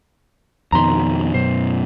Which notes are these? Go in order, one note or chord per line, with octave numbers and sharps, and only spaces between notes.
F2 B2 D#3 A#5 C6
F#2 B2 C5